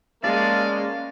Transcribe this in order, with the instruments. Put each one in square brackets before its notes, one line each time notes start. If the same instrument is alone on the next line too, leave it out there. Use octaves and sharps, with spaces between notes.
[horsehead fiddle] G#3 [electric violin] A#3 C#4 [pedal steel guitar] D5 A5 [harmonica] F5